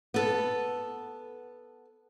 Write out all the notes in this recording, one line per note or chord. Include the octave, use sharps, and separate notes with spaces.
B3 A4